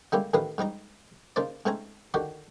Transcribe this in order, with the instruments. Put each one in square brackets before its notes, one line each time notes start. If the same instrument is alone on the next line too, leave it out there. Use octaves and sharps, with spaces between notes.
[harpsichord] D3 G3 G#3 A#3 E4 G4
A1 A2 D#3 B4 F5 D#6
G#2 G3 D#4 A#5
C#3 A#3 D#4 C5 D5
G#2 A3 C4 C#4 G#5 A#5
D3 D#3 F#4 G4